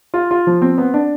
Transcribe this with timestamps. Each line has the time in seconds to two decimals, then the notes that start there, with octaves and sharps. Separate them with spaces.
0.14 F4
0.31 F4
0.47 F3
0.62 C4
0.78 B3
0.94 D4